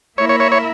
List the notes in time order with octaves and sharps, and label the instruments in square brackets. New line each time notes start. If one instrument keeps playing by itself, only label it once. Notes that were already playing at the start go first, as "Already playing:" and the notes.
[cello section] A#3 E4 A#4 E5 [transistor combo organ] C#5
[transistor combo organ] C#5
C#5
C#5